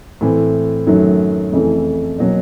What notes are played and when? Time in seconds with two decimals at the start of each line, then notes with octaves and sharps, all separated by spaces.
0.21 A2 E3 A3 C4
0.87 F#2 D#3 F#3 A3
1.52 F2 C#3 E3 A3
2.18 B2 F#3 A#3 C#4